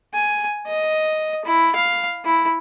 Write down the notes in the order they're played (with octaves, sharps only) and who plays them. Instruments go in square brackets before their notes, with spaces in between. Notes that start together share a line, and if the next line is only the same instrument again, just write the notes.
[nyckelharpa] G#5
D#5
E4
F5
E4